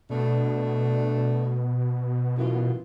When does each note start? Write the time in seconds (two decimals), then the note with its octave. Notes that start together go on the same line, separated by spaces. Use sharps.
0.10 B2 A3 D4
2.38 F#2 E3 F4